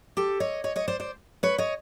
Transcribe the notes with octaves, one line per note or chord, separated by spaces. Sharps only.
G4 A4
C#5 D#5
C#5 D#5
C#5 D#5
C5 D5
C5 D5
B4 C#5
C#5 D#5